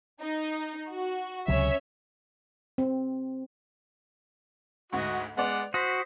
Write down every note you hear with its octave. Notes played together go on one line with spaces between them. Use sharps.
D#4
F#4
C#2 C3 F#3 C#4 C#5 E5
C4
D2 G#2 F#4 D#5
G#3 B3 D5 F#5 F7
F#4 C5 D#6 A#6 B6